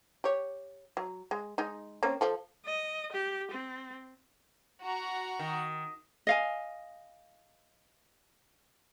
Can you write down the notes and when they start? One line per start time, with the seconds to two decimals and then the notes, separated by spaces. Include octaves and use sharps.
0.24 G4 C#5
0.97 F#3
1.31 G#3
1.58 G#3 D#4
2.03 A#3 C4 C#4
2.21 F3 A4
2.66 D#5
3.12 G4
3.51 C4
4.82 F#4 A#5
5.39 D#3
6.27 D#5 F5 G#5